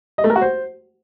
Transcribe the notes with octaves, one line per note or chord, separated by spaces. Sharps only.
D#5
A3
A#4
F#4
C5